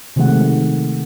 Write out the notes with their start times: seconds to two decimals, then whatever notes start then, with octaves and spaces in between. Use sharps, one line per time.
0.16 C3 D#3 F3 G#3 A3 F#5